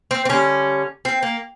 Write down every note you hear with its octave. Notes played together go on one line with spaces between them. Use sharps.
C4
C4
D3 G3 C#4
C4
A#3